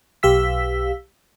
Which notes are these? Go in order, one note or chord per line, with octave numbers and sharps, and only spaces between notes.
B1 G4 F5 E6 B6